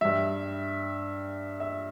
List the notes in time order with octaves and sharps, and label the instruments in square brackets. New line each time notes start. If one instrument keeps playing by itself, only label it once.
[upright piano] G2 G3 E5
E5